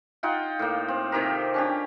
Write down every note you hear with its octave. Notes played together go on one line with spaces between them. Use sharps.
D#4 F4 F#5 G5
A2 A#3
C4
C3 D#3 G4 A#4
C#4 D4 G4